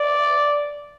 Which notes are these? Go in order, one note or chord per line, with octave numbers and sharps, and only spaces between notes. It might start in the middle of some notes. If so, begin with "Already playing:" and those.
Already playing: D5